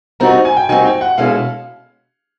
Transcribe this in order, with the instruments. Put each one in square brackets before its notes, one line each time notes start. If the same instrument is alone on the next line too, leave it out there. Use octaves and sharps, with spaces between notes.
[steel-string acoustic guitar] G3 C4 D#4 F#4 [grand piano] A#5
[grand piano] G#5
G5
[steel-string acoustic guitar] G3 C4 D#4 F#4 [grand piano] G#5
[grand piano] G5
F#5
[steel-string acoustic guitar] B2 G#3 C#4 E4 A4 [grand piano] F5